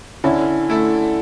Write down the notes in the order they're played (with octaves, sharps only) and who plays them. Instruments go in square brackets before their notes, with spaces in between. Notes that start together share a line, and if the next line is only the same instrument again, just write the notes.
[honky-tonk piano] D3 [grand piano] C#4 E4
[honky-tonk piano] A3 E4 A4